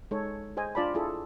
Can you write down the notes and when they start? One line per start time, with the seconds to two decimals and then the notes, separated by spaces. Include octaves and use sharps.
0.11 G#3 D#4 A4 C#5
0.57 G#4 C5 D#5 G#5
0.75 D4 F4 D5 A5 B5
0.94 E4 F4 G#4 A4